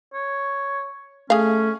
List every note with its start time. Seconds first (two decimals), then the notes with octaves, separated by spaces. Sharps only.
0.14 C#5
1.30 A3 C#4 G#4 F5